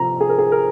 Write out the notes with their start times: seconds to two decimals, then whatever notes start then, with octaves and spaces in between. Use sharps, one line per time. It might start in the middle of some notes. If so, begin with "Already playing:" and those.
Already playing: C3 F3 C4 A#5
0.21 G#4
0.29 A#4
0.38 G#4
0.52 A#4